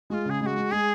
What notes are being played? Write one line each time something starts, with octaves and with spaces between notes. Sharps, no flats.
G#3 F4 F#4
C#3 G#4
G#3 G#4
F#4
G#3
G#3 G#4